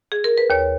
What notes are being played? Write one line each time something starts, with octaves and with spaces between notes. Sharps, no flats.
G#4
A#4
B4
D#2 C#5